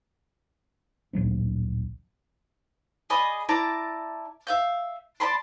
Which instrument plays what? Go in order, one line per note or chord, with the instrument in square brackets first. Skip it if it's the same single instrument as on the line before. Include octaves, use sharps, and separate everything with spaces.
[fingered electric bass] D1 A#1 F#3 C4
[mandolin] G#4 D5 D#5 B5
E4 D5 A5 A#5
E5 F5 G6
D5 A5 B5 C6